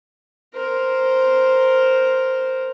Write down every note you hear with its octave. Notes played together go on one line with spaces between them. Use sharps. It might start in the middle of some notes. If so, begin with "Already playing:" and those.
A#4 C5